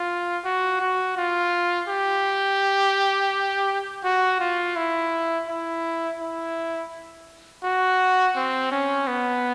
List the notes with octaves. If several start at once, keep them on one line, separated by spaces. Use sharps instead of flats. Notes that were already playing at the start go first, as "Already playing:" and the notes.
Already playing: F4
F#4
F#4
F4
G4
F#4
F4
E4
E4
E4
F#4
C4
C#4
B3